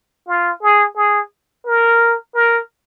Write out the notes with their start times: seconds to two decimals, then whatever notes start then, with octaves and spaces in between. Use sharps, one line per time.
0.28 F4
0.62 G#4
0.96 G#4
1.66 A#4
2.35 A#4